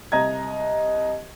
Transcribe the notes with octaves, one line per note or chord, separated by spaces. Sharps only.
C2 D#5 A#5 G#6